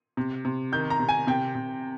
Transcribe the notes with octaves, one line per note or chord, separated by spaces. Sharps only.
C3
C3
D#3 G6
A#5
C3
G#5
C3 G5
C3